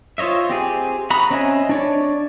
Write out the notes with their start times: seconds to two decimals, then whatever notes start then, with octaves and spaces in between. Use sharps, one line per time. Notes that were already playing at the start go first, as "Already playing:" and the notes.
0.18 F4 C5 C#5 D#5 E5
0.50 C4 G4 G#4
1.10 F#4 A#5 B5 D#6
1.31 C4 C#4 D#5 E5 G#5
1.69 D4 C#5 D5